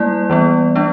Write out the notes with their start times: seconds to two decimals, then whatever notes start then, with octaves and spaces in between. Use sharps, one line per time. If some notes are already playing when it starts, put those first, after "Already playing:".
Already playing: G3 A#3 E4 D5
0.30 E3 G3 B3
0.76 G3 B3 D4